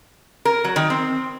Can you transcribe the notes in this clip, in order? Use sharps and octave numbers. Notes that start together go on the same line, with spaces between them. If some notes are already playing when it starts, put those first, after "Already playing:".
A#4
F#3
D#3
C4